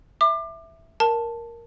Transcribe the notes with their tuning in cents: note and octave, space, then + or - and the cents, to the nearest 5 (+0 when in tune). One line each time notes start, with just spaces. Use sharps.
E5 +0 D6 +30
A#4 +0 A5 +5